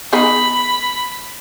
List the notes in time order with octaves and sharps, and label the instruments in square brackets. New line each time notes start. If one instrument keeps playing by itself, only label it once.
[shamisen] B3 D#4 G#4 [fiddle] B5